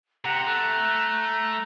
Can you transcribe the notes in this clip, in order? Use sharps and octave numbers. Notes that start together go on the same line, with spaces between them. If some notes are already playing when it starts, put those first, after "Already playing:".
C3 F#5 A#5
A3 F#6